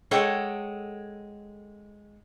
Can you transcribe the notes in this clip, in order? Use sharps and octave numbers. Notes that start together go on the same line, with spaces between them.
G#3 A4 C#5 F#5 G5